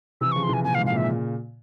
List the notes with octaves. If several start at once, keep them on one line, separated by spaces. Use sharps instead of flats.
C3 E3 E6
C#3 F3 C#6
C6
C3 E3 G#5
A#2 C#3 G#5
F5
G#2 C3
F5
A#2 C#3 E5